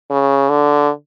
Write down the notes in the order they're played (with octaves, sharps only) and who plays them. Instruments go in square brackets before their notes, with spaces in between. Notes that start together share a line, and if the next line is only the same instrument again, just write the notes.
[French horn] C#3
D3